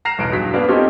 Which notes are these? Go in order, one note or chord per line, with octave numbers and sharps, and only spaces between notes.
A#5 F6 A#6 C7 E7 F7
B1 E2 D7
G2 F#3 G#4 B6
A#3 B3 C#4 D4
C4 C#4 D#4 F4 G4 A4